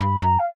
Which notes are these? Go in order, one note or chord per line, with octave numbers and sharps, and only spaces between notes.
G2 B5
F#2 A#5
F5